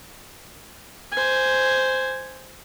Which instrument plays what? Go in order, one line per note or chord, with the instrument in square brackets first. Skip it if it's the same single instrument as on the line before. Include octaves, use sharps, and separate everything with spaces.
[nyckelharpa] C5 G#5